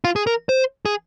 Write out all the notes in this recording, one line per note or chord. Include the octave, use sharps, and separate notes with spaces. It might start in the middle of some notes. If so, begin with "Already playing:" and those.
F4
G#4
A#4
C5
G#4